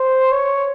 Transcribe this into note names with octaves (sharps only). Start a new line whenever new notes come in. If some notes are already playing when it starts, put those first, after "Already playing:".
Already playing: C5
C#5